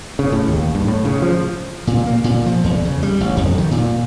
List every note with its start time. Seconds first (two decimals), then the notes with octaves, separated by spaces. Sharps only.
0.19 C#3
0.32 A2
0.48 D#2
0.75 G2
0.87 A2
1.05 C#3
1.22 F3
1.87 A#2
2.07 A#3
2.24 A#2
2.46 F3
2.64 E2
2.85 C#3
3.03 G3
3.20 A1
3.37 F2
3.58 D#3
3.71 A#2